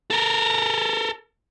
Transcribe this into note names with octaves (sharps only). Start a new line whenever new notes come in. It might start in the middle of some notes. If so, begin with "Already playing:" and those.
A4 A#4